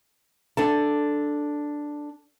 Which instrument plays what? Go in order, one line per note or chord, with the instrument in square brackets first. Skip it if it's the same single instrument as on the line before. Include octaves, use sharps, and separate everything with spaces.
[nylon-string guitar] D4 A4 A5